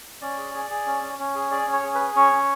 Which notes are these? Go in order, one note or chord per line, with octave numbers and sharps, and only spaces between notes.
C#4 D5
G#4
G#4
G#4
C#4
C#4
C#4
G#4
G#4 D5
C#4
C#5
G#4
B4
G#4
C#4 C#5
C#4